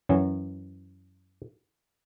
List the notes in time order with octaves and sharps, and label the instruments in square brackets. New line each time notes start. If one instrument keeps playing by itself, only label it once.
[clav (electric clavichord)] F#2 E3 F#3 C#5